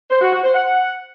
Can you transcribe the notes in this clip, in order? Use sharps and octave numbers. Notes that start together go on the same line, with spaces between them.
C5
F#4
F#4
C5
F#5